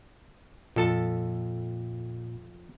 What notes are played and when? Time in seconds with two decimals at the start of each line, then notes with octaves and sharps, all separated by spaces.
0.76 F2 A#2 A4 A5